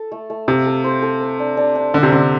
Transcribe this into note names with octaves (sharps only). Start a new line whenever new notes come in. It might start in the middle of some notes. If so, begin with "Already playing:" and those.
Already playing: A4
A3
A3
C3 F5
A4
C5
A4
C5
D4
D4
D4
D3 D4
C3
D3 C5